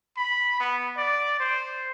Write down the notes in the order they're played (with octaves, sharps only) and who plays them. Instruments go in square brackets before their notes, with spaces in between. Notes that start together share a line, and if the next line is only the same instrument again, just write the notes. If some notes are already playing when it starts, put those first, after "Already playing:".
[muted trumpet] B5
B3
D5
C5